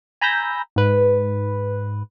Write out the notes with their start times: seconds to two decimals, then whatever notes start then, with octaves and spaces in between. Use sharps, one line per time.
0.21 G#5 A#5 B5 E6 G6 A#6
0.76 G#2 B4